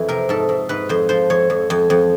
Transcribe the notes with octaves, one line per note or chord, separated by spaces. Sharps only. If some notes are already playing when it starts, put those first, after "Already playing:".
Already playing: F2 E3
C3 A#4
G#2 A4
G#2
G#2 B4
F2 C5
F3 C5
F2 C#5
F2
F2
F2